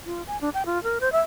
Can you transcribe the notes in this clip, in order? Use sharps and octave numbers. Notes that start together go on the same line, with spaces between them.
F4
G#5
D4
G5
F4
A#4
C5
E5